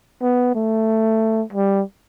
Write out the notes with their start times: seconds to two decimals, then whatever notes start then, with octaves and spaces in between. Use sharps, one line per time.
0.22 B3
0.55 A3
1.53 G3